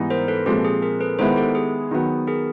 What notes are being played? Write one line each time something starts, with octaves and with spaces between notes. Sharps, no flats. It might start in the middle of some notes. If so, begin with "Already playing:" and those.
Already playing: G#2 E3 G3 B3 D#4
A#4 C5
A4 B4
A#2 F3 G#3 C4 G4 A4
G#4
G#4 A#4
A4 B4
D#3 G#3 B3 E4 A#4 C5
G4 A4
G#4
D#3 F#3 B3
G#4 A#4